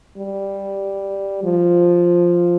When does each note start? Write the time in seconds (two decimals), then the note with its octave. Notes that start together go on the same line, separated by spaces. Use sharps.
0.18 G3
1.44 F3